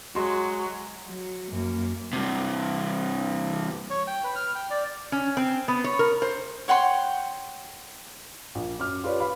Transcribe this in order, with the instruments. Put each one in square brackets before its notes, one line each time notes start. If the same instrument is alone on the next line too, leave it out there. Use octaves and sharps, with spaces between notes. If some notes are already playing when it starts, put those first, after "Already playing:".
[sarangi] F#3 [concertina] G#3 [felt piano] F#4 C6
[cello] F#3
F#2 A#3
[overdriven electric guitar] G2 C3
[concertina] C#5
G5
B4
F6
G5
D5
[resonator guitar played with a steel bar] C#4
C4
B3
C#5
A#4
C5
[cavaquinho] C#5 F#5 G5 C6
[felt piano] A#1
F#2 D6 F6
F4 G4 B4 C#5 D5
F5 B5